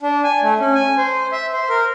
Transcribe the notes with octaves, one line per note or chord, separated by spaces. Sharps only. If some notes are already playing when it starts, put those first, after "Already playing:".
D4
G#5
A3
C#4
G#5
C5
E5
C5
A#4